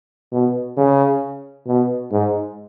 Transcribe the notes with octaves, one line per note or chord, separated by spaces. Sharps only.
B2
C#3
B2
G#2